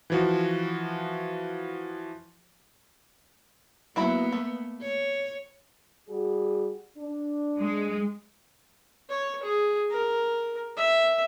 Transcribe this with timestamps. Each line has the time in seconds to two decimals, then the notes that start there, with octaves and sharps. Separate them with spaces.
0.10 E3 F3 F#4
3.96 F#3 A#3 B3 E4 B5
4.32 A3
4.81 C#5
6.09 G3 F#4 G#4
6.97 D4
7.61 G#3
9.09 C#5
9.43 G#4
9.90 A#4
10.76 E5